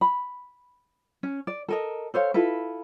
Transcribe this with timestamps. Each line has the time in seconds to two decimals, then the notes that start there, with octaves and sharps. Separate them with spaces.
0.01 B5
1.23 C#4
1.47 D5
1.68 A4 A#4 D#5
2.14 A4 C5 C#5 F5
2.34 E4 F4 A4 B4